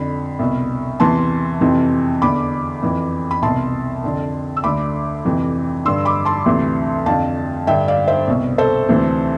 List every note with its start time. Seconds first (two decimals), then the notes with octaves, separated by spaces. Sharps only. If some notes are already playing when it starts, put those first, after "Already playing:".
Already playing: F2 D3 B5
0.39 C2 B2
1.00 E2 C3 E3 A5 C6
1.61 F2 C3 E3
2.22 E2 D3 B5 D6
2.82 F2 E3
3.31 B5
3.42 C2 B2 A5 C6
4.04 F2 D3
4.57 E6
4.64 D2 D3 B5 D6
5.25 F2 C3 E3
5.85 G2 D3 C6 E6
6.05 B5 D6
6.25 A5 C6
6.46 D2 C3 E3
7.06 F2 D3 F5 A5
7.67 G2 D3 E5 G5
7.88 D5 F5
8.08 C5 E5
8.27 C2 B2
8.58 A4 C5
8.89 D2 C3 E3